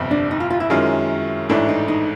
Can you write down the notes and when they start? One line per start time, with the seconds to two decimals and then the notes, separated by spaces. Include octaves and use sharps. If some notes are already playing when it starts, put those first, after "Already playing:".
Already playing: G1 F2 C3
0.11 D4
0.31 D#4
0.40 F4
0.50 F4
0.60 E4
0.70 F#2 D#3 G#3 C#4 F4
1.49 A1 G#2 E3 A3 D4 E4
1.69 D#4
1.88 D#4